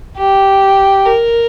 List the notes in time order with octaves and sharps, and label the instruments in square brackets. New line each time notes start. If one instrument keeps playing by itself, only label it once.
[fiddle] G4
A#4